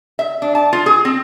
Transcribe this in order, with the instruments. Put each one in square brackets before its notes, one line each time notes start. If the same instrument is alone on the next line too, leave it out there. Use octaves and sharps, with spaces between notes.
[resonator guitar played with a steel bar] E5
D4
A5
F4
G#4
C4